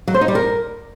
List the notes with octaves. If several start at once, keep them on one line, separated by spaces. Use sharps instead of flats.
F#3
C5
D#4
G3
A#4